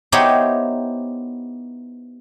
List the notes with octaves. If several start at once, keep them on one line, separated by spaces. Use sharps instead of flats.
B3 D#4 E4 G4 C5 C#5